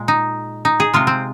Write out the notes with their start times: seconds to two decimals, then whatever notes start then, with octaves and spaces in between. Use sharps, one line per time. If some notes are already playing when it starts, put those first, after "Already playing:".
Already playing: A#2 G#3
0.08 D#4
0.65 D#4
0.80 G#4
0.94 C3 G#3 F4
1.07 C4